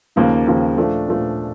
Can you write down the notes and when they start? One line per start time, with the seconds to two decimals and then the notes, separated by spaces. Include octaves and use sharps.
0.16 D#2 C#3 F3 A#3
0.46 D#2 C#3 F3 A#3
0.77 A#2 F3 A3 D4
1.08 A#2 F3 A3 D4